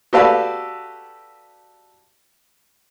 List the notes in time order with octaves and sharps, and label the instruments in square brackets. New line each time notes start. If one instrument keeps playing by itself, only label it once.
[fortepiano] F#4 G4 A4 B4 D5 F5